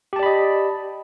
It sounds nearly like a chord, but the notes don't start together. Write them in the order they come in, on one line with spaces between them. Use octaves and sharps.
G4 A5 D5 B5 D#5